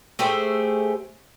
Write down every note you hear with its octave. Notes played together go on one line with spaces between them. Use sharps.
A3 G4 G#4 C5